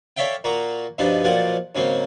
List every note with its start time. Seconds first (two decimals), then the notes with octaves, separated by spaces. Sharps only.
0.17 A4 C#5 D5 E5 F5 G5
0.44 A#2 A#3 F#4 A#5
0.98 G2 B2 F3 B3 D4 D#4
1.24 B1 A#2 F3 D5 F#5 G#5
1.75 G#2 C#3 F#3 A#3 C4